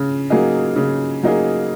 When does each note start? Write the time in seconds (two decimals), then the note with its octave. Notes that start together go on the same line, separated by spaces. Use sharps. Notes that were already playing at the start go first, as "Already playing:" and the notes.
Already playing: C#3
0.30 F#3 A#3 D#4 G#4
0.76 C#3
1.23 F#3 A#3 D#4 G#4